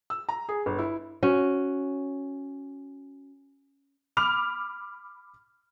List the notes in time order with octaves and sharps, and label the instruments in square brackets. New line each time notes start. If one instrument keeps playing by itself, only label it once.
[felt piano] E6
A#5
G#4
G1
E4
[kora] C#4 F#4
[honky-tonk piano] B5 D6 F6 F7